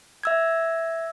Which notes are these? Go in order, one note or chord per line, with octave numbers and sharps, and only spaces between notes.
E5 E6 G#6